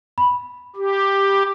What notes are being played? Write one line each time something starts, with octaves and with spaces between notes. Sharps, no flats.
B5
G4